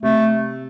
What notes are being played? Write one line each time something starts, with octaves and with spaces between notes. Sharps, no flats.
C3 A3